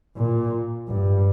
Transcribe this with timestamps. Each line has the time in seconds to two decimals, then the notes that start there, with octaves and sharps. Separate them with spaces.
0.17 A#2
0.88 G2